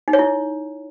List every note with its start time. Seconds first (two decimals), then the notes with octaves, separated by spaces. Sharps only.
0.08 D#4
0.13 C#5
0.19 E4